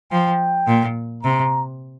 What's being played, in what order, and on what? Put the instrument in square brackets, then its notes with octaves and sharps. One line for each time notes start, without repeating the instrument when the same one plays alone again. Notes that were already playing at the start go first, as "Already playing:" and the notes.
[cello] F3 [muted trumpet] G5
[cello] A#2
[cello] C3 [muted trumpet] A#5